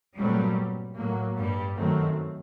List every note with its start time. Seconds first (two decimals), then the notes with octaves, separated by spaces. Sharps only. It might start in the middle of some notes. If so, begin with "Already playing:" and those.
0.17 G2 A#2 F#3 G3 A3 C4
0.96 A2 F#3 A#3
1.36 G2 G3
1.75 F#2 D#3 F#3 A3 C4